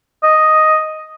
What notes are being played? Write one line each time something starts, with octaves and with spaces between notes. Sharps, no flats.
D#5